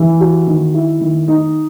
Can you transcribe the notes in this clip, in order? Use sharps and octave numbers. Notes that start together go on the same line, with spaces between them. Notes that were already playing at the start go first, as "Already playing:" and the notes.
Already playing: E3
F#4
D#3
E4
D#3
D#4